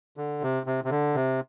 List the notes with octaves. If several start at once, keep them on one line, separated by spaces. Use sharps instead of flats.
D3
C3
C3
C3
D3
C3